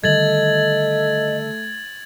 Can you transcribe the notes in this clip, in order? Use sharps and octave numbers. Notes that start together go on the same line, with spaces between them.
D3 D#3 G3 A3 D#5 G#6 A6 F#7